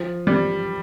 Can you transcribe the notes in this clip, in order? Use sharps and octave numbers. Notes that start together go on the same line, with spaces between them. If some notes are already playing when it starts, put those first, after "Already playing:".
Already playing: F3
G3